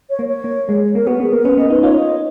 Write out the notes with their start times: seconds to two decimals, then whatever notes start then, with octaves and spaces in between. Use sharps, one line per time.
0.10 C#5
0.19 A#3
0.28 C#5
0.44 A#3
0.69 G#3
0.95 A#3 A#4
1.07 B3 F#4
1.20 B3 G#4
1.33 A#3 A#4
1.45 C#4 B4
1.57 B3 D#5
1.70 D#4 B4
1.83 F4 C#5
1.96 D#5